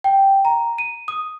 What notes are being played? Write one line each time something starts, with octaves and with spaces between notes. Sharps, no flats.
G5
A#5
D#7
D#6